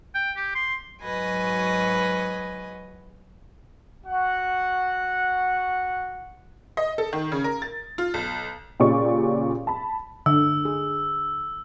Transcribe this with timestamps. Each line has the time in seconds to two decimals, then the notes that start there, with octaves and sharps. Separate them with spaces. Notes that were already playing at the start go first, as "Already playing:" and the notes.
0.15 G5
0.37 G4
0.55 C6
1.02 G#2 F#3 F#4 B4 D#5 G#5
4.05 F#4 F#5
6.77 D#5
6.98 A4
7.13 D#3
7.32 C#3
7.44 A#4
7.62 A6
7.98 F4
8.14 B1
8.80 A#2 C#3 C#4 G4 D5 C#6
9.67 A5 B5
10.26 D3 E6
10.65 G#4